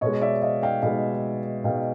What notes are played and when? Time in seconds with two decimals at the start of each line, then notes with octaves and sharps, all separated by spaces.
0.01 B2 G#3 C#5 D#5
0.22 D5 E5
0.42 D#5 F5
0.63 F5 G5
0.83 B2 G#3 F5 G5
1.64 B2 G#3 F5 G5